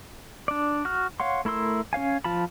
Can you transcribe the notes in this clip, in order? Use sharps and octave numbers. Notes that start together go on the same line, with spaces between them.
D4 D5
F#4 F6
C#5 F5 F#5 C6
A3 E4 A#4 C6 E6
C#4 C#5 F5 G#5
F3 F4 A5 B5